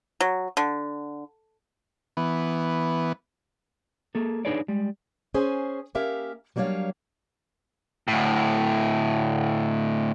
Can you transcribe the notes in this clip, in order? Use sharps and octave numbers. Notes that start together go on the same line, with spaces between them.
F#3
D3
E3 B3
A#3 G#4 A4
D4 D#4 G#4 B4 C#5 D5
G3 G#3
C#4 G#4 C5 G#5
A#3 C#4 G4 A#4 E5 F5
F#3 G3 A#3 D4 C#5 F5
D2 A2